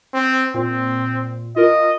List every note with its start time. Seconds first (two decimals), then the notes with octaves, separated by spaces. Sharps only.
0.14 C4
0.54 A#2 C4
1.56 F4 A#4 D#5